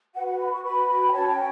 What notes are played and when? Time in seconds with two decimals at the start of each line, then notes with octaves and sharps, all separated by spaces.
0.15 F#4 B4 F#5
0.28 F#5
0.39 B5
0.52 C#6
0.64 F#4 B4 B5
0.89 B5
1.07 G5
1.12 C#4 F#4 C#5 A5
1.29 G5